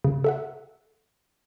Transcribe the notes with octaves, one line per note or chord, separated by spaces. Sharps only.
C#3
A4 E5 F#5